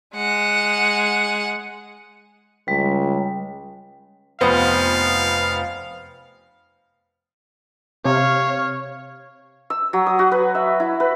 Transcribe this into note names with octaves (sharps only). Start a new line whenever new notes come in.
G#3 F#5
C#2 G3
F1 B3 C5 F5
C3 C#5 F5
E6
F#3
D#6
F#4
B4
E5
E4
B4